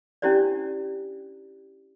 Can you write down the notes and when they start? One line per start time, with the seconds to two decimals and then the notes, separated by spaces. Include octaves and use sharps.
0.22 C#4 D4 E4 G4 C5 D5